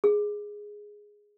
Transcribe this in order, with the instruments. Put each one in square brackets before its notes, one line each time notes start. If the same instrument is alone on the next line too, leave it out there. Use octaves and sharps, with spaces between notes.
[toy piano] G#4